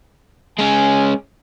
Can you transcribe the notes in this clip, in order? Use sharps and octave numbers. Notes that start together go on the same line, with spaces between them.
G#3 C#4 G#5